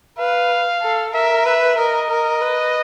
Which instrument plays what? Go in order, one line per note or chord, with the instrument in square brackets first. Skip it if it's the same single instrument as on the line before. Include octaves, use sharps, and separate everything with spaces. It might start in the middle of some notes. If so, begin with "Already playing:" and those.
[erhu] B4 [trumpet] F5
[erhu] A4
[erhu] A#4 [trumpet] E5
[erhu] B4 [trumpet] E5
[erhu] A#4 [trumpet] D#5
[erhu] A#4
B4